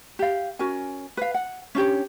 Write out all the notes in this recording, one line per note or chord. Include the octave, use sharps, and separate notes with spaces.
G4 F5
C#4 F#4 A#4 G#5
B4 F5
F#5
C#4 D4 G4 C#5